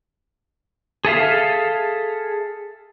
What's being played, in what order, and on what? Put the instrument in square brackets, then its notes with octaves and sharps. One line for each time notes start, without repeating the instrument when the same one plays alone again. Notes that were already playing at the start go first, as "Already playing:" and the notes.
[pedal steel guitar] G#4 A4 E5 F5